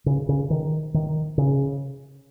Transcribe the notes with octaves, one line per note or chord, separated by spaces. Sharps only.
C#3
C#3
D#3
D#3
C#3